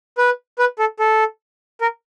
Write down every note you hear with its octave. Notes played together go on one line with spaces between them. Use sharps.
B4
B4
A4
A4
A#4